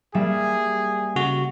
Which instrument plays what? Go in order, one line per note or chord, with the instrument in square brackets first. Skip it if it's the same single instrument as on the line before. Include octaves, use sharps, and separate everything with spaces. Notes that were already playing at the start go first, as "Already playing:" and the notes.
[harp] G3 A#3 E5 [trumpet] G#4
[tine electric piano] C#3 F#4